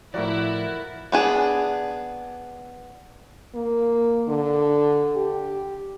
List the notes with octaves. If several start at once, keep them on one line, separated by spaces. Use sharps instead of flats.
A2 F3 E4 F#4 A#4 D5 F#5
B3 D4 G#4
A#3
D3
G4